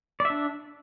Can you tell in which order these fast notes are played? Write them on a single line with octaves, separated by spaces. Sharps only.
D5 E5 D4